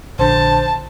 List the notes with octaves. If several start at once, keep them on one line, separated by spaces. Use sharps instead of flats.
A#1 D3 C5 A5